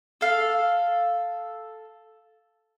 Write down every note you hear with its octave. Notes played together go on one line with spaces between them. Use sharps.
A4 F5